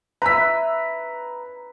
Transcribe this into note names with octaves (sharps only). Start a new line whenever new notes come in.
B4 E5 A#5 B6